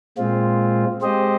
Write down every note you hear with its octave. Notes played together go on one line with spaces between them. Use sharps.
A#2 G#3 C4 F4
G#3 C4 G4 C5 D#5